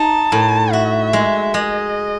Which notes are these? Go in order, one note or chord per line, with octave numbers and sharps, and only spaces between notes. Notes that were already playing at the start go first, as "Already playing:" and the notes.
Already playing: D#4 A5
A2
F#4 E5
G#3
G#3 D#5